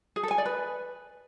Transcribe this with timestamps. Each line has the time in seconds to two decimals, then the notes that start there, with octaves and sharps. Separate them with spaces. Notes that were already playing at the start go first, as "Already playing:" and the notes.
0.16 G#4
0.23 A4
0.31 G#5
0.38 D5
0.45 B4